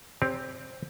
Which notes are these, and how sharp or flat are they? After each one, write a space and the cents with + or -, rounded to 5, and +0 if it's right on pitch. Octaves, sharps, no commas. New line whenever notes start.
C4 +5 G4 +10 C#5 +35